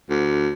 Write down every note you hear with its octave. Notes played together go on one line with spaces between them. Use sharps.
D2